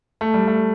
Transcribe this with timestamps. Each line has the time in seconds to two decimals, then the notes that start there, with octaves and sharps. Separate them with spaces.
0.21 A3
0.34 G3
0.48 A3